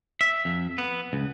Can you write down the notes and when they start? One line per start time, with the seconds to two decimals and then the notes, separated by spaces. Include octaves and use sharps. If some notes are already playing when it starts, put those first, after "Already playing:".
0.21 E5
0.45 F2
0.78 B3
1.13 C#2